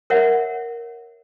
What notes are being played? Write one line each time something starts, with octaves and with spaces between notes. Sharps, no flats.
A#4 C#5 E5 F#5